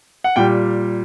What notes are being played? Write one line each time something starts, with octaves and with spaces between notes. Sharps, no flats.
F#5
A#2 G3 G5